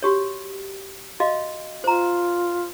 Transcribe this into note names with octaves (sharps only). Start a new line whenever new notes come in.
F#4 G4 C#5
F#4 D#5 F5
F4 C5 A#5